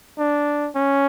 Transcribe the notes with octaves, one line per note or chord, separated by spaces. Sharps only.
D4
C#4